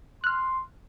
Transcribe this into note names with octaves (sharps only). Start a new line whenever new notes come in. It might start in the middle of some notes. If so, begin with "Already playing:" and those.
C6 F6 F#6